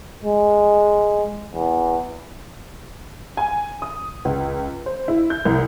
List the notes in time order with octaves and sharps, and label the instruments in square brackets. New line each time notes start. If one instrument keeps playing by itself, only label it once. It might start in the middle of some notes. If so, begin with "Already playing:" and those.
[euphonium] G#3
E2
[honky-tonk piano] G#5
D#6
C#2
C5
E4
G6
C2